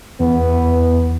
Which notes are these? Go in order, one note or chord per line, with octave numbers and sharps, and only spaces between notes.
E2 B3